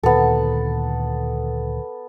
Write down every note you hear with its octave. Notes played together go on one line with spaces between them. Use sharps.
D2 A#2 D#3 B3 A4